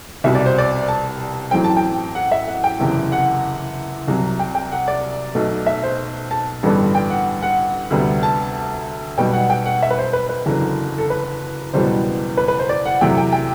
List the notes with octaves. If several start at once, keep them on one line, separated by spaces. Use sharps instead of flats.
C2 B2 G3 E5
D5
C5
D5
A5
A1 A2 F#3 C4 G5
A5
G5
F#5
E5
F#5
G5
F#1 E2 C3
F#5
C2 C3 F#3
G5
G5
F#5
D5
B1 B2 A3
E5
C5
A5
A1 G2 D3 G3 B3
G5
F#5
F#5
D2 C3 G3 B3
A5
B1 B2 G3 B3 G5
F#5
G5
F#5
E5
B4
C5
B4
B4
F#1 E2 D3 F#3
A4
B4
F#1 E2 B2 G3 B3 C5
B4
B4
C5
D5
F#5
E2 C3 F#3 A3 G5
G5
G5